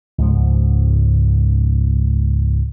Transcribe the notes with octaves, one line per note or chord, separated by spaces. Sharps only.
C#2 G#2 F3